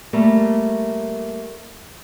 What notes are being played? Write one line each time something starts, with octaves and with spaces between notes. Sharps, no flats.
G3 A3 A#3